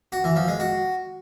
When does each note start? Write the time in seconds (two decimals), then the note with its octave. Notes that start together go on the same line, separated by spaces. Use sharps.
0.12 F#4
0.24 E3
0.36 F3
0.48 G#3
0.60 F#4